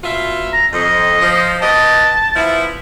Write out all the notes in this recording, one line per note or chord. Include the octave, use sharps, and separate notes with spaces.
B2 F4 E5
A#5
F2 D#5
F3
G4 B4 D#5 A5
F3 B3 E4